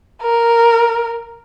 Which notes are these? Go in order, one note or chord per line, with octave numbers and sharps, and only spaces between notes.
A#4